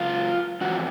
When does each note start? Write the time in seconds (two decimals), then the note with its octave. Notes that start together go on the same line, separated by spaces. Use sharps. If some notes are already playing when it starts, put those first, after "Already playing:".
Already playing: F#2 C#3 F4
0.61 F2 C3 E3 F#4